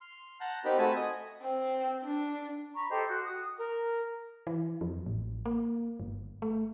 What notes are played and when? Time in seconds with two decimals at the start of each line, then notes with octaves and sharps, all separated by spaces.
0.01 C6 F6
0.40 F#5 A5 A#5 F#6 G6
0.65 C4 D#4 G4 A#4 B5
0.78 A3 C4 F#4 G#5 A5 B5
0.96 D#5 G#5 D#6
1.42 C4
2.05 D4
2.75 A#5 B5 C#6
2.88 G4 A4 C5 D#5
3.07 F#4
3.25 F#4 D#6
3.59 A#4
4.47 E3
4.81 F2
5.06 A1
5.46 A#3
6.00 G1
6.42 A3